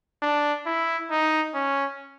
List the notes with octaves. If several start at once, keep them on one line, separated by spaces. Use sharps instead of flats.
D4
E4
D#4
C#4